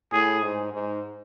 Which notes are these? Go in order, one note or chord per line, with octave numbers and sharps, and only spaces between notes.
A2 G#4
G#2
G#2